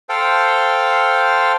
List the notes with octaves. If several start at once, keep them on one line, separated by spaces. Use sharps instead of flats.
A4 C5 F5 G5